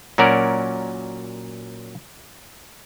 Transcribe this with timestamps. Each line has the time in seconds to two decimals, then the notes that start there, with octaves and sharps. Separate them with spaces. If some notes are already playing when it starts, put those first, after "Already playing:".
0.18 A#2 F#3 C#4 F#4 A#4 D5